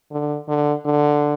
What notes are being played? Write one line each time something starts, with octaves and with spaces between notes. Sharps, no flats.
D3
D3
D3